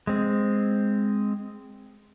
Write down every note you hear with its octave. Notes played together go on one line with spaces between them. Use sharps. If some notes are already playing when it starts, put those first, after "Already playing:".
G#3 C4